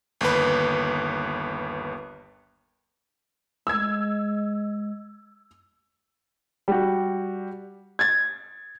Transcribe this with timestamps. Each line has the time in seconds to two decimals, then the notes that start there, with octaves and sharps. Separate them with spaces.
0.21 G1 D#2 B4
3.67 G#3 E6 G#6
6.68 G3 F#4
7.99 G#6 A6